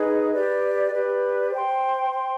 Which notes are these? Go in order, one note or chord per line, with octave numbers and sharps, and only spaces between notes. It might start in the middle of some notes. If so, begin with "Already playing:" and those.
Already playing: D#4 G#4 B4 D#5
G4 B4 D5
G4 B4 D5
C5 G5 C6
C5 G5 C6